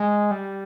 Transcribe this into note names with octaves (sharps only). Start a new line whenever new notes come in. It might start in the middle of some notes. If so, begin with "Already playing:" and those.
Already playing: G#3
G3